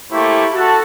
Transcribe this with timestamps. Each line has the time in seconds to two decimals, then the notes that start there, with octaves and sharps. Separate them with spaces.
0.12 A3 A#3 E4 G4 C5 C#6
0.53 F#4 A4 A5